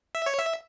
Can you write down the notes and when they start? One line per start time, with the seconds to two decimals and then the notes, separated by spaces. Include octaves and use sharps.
0.15 E5
0.26 C#5
0.39 E5